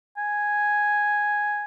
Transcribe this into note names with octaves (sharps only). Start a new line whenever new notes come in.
G#5